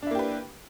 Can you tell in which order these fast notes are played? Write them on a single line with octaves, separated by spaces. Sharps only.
D4 E4 A#3 G4 B4